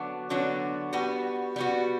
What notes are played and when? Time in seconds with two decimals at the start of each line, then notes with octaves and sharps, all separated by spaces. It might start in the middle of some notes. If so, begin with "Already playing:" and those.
Already playing: D3 F#3 B3 D4 F#4
0.30 D3 F#3 B3 D4 F#4
0.93 G3 B3 F#4
1.56 G3 B3 F#4